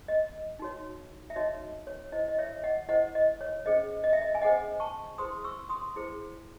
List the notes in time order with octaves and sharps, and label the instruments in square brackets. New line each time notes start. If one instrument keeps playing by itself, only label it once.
[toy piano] D#5
D#4 F#4 C#5
E5
D#4 F#4 C#5 D#5
C#5
E4 C5 D#5
D#5
C#5 E5
D#5 F#5
E4 C5 D#5 F#5
D#5
C#5
C#4 G#4 C5 D#5
D#5
E5
D#5
G#5
C#4 G#4 C5 D#5 F#5
A5 C#6
E4 G#4 C5 C6 D#6
C#6 E6
C6 D#6
E4 G#4 C5